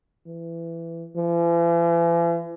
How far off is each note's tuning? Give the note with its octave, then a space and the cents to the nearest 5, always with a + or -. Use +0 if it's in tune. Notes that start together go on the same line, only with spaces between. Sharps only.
E3 +20
E3 +45